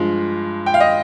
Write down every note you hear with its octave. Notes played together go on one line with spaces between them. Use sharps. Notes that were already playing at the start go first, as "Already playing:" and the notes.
Already playing: G2 F3 G#3
G5
F5
D#5